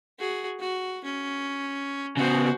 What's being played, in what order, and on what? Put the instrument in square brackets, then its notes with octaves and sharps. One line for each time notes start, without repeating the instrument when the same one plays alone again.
[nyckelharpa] F#4 G#4
F#4
C#4
[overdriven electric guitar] C#3 B3 [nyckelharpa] F#4 C5